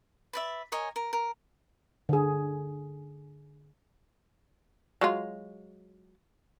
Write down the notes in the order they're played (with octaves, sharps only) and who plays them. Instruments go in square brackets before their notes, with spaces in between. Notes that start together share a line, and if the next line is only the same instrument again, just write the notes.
[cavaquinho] B4 D5 E5
A#4 C#5 D#5 G#5
A#4
A#4
[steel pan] D3 G#4
[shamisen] F#3 G#3 F4